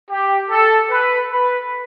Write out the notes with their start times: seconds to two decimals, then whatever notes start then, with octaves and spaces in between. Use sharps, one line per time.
0.10 G4
0.50 A4
0.90 B4
1.30 B4